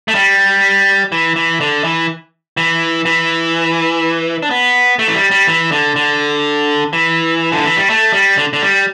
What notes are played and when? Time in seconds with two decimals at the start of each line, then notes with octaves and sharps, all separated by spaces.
0.08 A3
0.15 G3
1.12 E3
1.36 E3
1.60 D3
1.84 E3
2.57 E3
3.05 E3
4.42 D4
4.51 B3
4.99 A3
5.08 E3
5.15 G3
5.31 G3
5.47 E3
5.72 D3
5.96 D3
6.93 E3
7.52 D3
7.65 E3
7.77 G3
7.90 A3
8.13 G3
8.37 D3
8.53 D3
8.63 G3